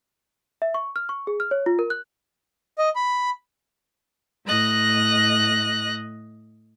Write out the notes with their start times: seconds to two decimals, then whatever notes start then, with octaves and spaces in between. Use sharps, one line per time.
0.62 E5
0.74 C#6
0.96 F6
1.09 C#6
1.27 G#4
1.40 F6
1.51 C#5
1.66 F4
1.79 A#4
1.90 F#6
2.78 D#5
2.96 B5
4.45 A2 D#5 F#6 A#6